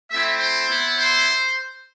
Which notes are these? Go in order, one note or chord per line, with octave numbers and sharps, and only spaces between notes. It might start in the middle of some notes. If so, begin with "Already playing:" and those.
A3 C4 E4 E5
C5
B3 E4
C5